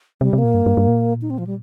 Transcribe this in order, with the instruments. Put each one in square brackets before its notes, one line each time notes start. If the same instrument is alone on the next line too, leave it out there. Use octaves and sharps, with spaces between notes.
[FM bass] C3 [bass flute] G3
[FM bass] C3
[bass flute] A#3
[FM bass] A#2
G2
G2
G2
A#2
[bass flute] D#4
C4
F3
G3